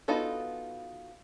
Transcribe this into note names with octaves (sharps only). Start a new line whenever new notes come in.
B3 D#4 F4 F#4 A4